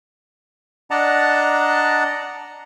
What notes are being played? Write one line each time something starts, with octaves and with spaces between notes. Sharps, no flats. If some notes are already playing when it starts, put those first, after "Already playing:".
D4 D5 D#5 F#5 A5 A#5